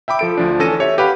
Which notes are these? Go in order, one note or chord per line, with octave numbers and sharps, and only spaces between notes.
E5 G5 B5 D6
F3 A4 D7
D2 F3 D4
E3 C#4 A4 A5 A#6 D#7
G4 C#5 E5
G4 B4 F5 F#5 B5